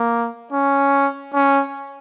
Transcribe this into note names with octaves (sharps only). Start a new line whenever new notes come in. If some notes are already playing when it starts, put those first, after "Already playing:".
Already playing: A#3
C#4
C#4